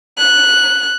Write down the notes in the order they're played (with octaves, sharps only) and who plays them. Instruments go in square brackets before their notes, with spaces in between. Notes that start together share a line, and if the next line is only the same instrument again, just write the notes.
[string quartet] F#6